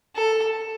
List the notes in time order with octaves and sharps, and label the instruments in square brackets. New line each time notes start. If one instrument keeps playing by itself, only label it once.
[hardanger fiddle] A4